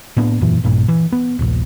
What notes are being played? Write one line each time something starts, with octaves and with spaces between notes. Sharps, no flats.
A2 A#3 B3 D4
E1 F#2 A#2 E3
A#1 G2 A#2
E3
B3
D#1 A#1